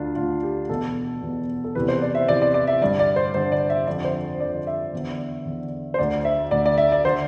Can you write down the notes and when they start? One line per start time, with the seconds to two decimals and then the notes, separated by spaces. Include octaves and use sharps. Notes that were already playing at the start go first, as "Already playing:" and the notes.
Already playing: D2 D3 D4 F4
0.16 D2 D3 F4
0.43 G4
0.69 E2 B2 A4
1.22 E2 B2
1.64 A4
1.75 E2 C3 E3 B4
1.88 C5
2.02 D5
2.15 E5
2.28 E2 C3 E3 D5
2.42 D5
2.54 D5
2.67 E5
2.81 G2 D3 D5
2.99 D5
3.16 C5
3.34 G2 D3 C5
3.52 D5
3.70 E5
3.87 F2 D3 D5
4.05 C5
4.40 F2 D3 D5
4.67 E5
4.93 E2 D3
5.45 E2 D3
5.94 C5
5.98 D2 D3 D5
6.25 E5
6.51 D2 D3 D5
6.66 D5
6.78 E5
6.92 D5
7.05 D3 C5